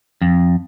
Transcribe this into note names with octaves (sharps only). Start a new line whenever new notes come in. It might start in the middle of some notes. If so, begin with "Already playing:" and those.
F2